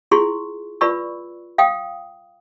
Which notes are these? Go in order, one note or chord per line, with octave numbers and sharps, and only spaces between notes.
E4 F4 G#4 C6 C#6
F4 B4 D5 B5 C#6 E6
F5 G5 D#6